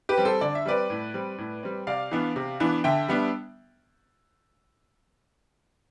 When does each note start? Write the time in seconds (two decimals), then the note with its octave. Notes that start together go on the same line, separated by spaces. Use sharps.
0.09 G4 B4
0.17 G3 C4
0.25 A4 C5
0.41 D3 D5
0.55 E5
0.65 G3 C4 B4 D5
0.90 A2
1.14 G3 C4
1.38 A2
1.63 G3 C4
1.87 C3 D5 F5
2.11 E3 B3 D4
2.36 C3
2.60 E3 B3 D4
2.84 D3 E5 G5
3.08 G3 B3 D4